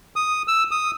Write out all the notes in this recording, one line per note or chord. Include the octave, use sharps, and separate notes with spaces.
D#6
E6
D#6